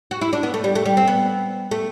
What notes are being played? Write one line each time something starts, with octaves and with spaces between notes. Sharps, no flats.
F#4
E4
D4
B3
A3
G3
A3
G3
C4
B3
A3